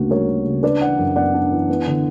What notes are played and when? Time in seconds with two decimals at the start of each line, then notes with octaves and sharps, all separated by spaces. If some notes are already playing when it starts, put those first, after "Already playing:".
Already playing: D2 C#3 A#3 F#4
0.10 G3 A#4 C#5
0.28 A#3
0.46 C#3
0.63 D4 B4 D5
0.81 E3 D5 F#5
0.99 F#2
1.16 B3 D5 F#5
1.34 D4
1.52 E3
1.69 B3
1.87 D3